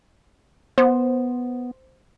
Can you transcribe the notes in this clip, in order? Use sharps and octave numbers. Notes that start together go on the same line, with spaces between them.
B3 C5